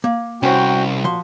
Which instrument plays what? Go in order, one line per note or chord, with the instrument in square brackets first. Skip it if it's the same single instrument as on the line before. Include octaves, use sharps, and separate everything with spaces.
[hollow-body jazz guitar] A#3
[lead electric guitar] C2 [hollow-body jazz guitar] C#4 C5 [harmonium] F#4 G5
[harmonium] A#2 [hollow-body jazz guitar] F3 F#4 C6